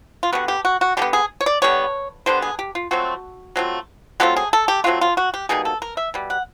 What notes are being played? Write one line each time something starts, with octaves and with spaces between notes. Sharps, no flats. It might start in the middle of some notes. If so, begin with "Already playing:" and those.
F4
D3 G3 B3 F#4
G4
F#4
F#4
D3 G3 B3 G4
G#4
C#5
D5
D3 G3 B3 C#5
D3 G3 B3 C5
G#4
G4
F4
F#3 A3 C4 F4 F#4
F#3 A3 C4 F4
F#3 A3 C4 F4 G4
G#4
A4
G4
F#3 A3 C4 F4 F#4
F4
F#4
G4
B2 G3 A#3 D#4 G#4
A4
A#4
E5
B2 G3
F#5